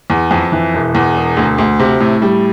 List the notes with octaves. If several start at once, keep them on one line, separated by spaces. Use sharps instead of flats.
E2
F2
E3
E1
E2
E1
D2
D2
C3
A2
G3